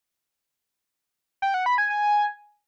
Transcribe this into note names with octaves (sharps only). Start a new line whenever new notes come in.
G5
F#5
B5
G#5
G#5